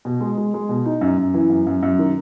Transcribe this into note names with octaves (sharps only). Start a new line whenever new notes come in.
B2
G#3
G#3
G#3
B2
D#4
F#2
F#2
E3
F#2
F#2
F#2
D#3